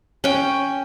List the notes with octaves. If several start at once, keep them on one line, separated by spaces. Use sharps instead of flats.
C#4 G5